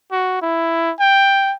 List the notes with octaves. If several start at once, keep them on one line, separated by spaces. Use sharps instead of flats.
F#4
E4
G5